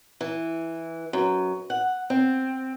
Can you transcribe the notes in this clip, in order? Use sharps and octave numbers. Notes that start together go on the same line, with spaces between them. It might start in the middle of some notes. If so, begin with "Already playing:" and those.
E3
F#2
F#5
C4